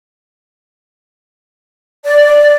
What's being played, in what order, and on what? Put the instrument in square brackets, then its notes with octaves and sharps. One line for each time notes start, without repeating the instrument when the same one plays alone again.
[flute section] D5